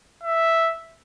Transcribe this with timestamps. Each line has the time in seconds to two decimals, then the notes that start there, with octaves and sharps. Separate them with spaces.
0.23 E5